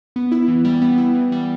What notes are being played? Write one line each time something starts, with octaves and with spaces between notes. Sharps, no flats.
B3
E4
E3
G3
B3
E4
E3
G3